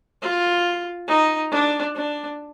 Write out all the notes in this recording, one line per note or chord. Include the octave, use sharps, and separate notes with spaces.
F4
D#4
D4
D4